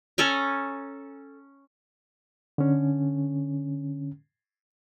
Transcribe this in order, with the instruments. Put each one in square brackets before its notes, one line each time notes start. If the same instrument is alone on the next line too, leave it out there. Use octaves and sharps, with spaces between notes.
[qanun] C#4 A4 G#5 A#5
[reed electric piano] D3 C#4